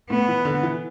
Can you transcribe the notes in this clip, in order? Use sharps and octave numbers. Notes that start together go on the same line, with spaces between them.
A2 B3
E3
D3
E3